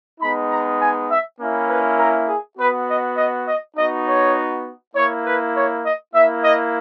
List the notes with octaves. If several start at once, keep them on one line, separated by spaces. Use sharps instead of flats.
G#3 B3 D#4 B5
A#5
G#5
E5
A#3 C#4 E4
B4
A#4
G#4
B3 F#4 B4
D#5
D#5
D#5
B3 D#4 F#4 D#5
C#5
A#3 E4 C#5
B4
C#5
D#5
A#3 E4 E5
D#5